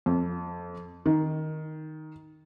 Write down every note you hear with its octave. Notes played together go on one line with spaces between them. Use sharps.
F2
D#3